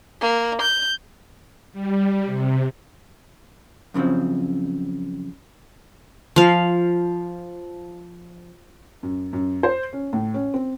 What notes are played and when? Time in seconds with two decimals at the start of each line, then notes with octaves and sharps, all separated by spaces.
0.21 A#3
0.61 G6
1.73 G3
2.25 C3
3.94 F#2 C#3 E3 F3 C4
6.36 F3 F5
9.03 F#2
9.33 F#2
9.63 C5
9.93 C#4
10.13 A2
10.34 C#4
10.54 C4